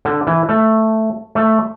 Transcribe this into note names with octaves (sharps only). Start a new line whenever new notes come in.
D3
E3
A3
A3